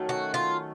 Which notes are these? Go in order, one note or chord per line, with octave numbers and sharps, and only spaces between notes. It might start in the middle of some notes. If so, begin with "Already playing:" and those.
Already playing: D#3 F#3 A3 C#4
F#4
F4